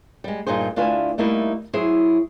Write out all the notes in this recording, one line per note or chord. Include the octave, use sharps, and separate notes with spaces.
G3 G#3
G2 A#2 D#4 G#4 C5
D2 D4 E4 F4 B4 G#5
G3 A3 A#3 D#4 E4
F#3 E4 G#4 C5